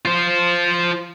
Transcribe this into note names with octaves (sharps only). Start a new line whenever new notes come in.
F4 C5